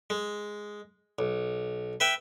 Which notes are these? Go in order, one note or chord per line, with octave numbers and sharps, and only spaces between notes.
G#3
B1
B4 E5 G5